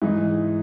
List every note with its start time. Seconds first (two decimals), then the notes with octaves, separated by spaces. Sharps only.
0.02 G#2 E3 G#3 D#4